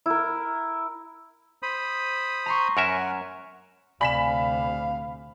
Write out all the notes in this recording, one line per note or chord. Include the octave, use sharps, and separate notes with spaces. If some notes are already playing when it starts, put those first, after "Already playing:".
E4 A#4
C5 B5 D#6
A#5 C6 C#6
F#2 A#4 E5 F#5 G#5 F6 C#7
D2 C3 D5 F5 G#5 B5 B6 E7